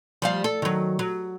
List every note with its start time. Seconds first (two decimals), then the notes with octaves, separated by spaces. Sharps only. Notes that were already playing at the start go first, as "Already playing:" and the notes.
0.22 F3 G3 F5
0.44 A4
0.62 D#3 F#3
0.99 F#3